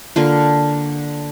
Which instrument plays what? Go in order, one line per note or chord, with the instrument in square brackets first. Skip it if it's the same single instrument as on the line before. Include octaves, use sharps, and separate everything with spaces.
[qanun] D3 A#3 F4